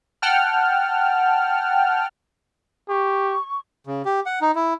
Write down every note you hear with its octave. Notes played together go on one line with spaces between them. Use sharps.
F#5 G5 A5 F6
G4 C#6
C#3
G4
F#5
D#4
E4